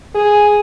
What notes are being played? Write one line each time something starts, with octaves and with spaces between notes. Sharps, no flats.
G#4